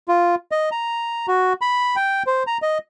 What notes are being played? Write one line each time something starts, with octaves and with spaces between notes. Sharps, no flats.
F4
D#5
A#5
F#4
B5
G5
C5
A#5
D#5